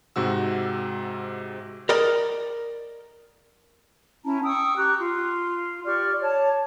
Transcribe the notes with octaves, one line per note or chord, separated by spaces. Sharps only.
G#2 C3 F#4 E6
A#4 D5 D#5
C#4 E4 A5 A#5
G5 C#6 D#6 E6
G4 A#5 C#6 F#6
F4
G4 D5 C#6 F6
C#5 A5